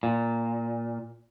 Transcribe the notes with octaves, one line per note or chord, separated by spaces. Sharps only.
A#2